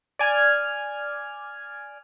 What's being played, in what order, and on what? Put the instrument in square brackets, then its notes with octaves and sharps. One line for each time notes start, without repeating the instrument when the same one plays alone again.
[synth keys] D5 G#5 F6 G#6